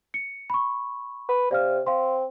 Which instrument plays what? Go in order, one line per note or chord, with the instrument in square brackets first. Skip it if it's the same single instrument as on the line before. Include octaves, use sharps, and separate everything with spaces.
[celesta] C#7
B5 C#6
[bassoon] B4
[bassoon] C3 [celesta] D5 F5 F6
[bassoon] C4 [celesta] F5 C6